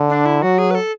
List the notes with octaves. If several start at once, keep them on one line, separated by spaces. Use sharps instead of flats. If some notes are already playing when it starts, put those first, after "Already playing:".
Already playing: D3
D4
E4
F#3 F#4
G#4
B4
A4